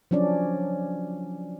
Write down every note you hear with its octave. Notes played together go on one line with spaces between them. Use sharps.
F3 F#3 C#4 D4 D5